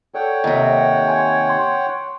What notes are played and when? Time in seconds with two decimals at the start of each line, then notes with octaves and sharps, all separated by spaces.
0.15 A4 C#5 D5 F#5 G5
0.44 D#2 C3
1.07 G#5 C6 G#6
1.49 C6 C#6